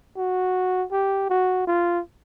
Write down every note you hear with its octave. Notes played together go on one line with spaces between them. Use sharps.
F#4
G4
F#4
F4